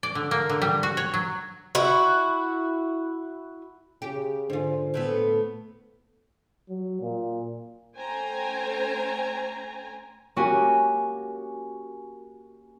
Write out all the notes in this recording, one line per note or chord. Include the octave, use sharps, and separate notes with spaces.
D5
D3
A#3
D3
G3
F#4
C#5
F#3
E4 F#4
C#3 G4
G#2 D3 F4 C5
A2 A3 B3
F#3
A#2
A3 C#4 C5 G5 G#5 A#5
A#3 C#4 F#4 G4 G#5